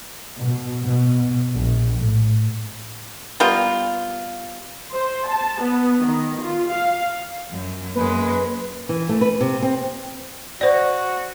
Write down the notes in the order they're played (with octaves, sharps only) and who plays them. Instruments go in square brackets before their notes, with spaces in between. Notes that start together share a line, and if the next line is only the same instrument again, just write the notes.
[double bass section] B2
B2
A#1
A2
[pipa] G3 A#3 B3 F4
[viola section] C5
A5
B3
D#3
F4
F5
[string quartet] F#2
[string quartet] F#2 G#3 [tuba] A#3 [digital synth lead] B4
[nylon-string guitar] E3
A3
B4
C3
C4
[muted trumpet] F#4 [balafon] C5 D5